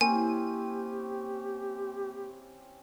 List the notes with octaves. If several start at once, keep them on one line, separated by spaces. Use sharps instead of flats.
A#3 C4 C#4 E4 G4 G#5